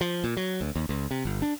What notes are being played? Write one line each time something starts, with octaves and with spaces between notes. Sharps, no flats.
F3
A#2
F#3
D2
D#2
C#2
C3
G1
D4